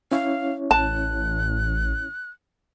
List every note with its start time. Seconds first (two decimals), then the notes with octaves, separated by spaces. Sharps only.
0.12 C#4 E4 C#5 F5
0.71 A1 A5 F#6